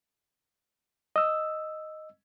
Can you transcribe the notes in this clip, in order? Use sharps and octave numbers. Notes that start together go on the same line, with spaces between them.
D#5 E6